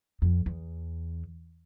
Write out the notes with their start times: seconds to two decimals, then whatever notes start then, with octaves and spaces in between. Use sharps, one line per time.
0.22 F2
0.46 E2